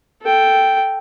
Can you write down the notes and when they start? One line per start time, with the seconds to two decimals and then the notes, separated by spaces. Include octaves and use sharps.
0.22 A4 G5